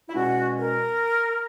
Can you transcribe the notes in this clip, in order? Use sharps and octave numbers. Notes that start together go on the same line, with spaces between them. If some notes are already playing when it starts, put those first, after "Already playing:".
E4
E2 B2 G#3 C#4 F#4
A#4